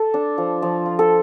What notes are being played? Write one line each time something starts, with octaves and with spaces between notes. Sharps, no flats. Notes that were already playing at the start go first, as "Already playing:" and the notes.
Already playing: A4
D4
F3
F3
F4
A4